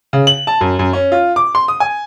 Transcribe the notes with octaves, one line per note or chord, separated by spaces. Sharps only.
C#3
F#7
A5
F#2
F#2
C#4
F4
D6
C6
D#6
G#5